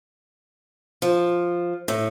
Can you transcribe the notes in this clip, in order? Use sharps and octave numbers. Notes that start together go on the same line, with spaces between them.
F3
A2